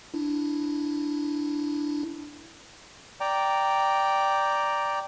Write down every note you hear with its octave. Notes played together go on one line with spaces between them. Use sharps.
D4 E4
D5 G5 A#5